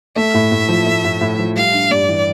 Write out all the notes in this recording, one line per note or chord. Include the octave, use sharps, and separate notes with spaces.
A3 E5
A2
A2
F3
A3
A2
A2
F3
G3 F5
D4
G2 D5
E3